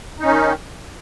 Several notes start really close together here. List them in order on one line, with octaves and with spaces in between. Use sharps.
D#4 C#4 D#3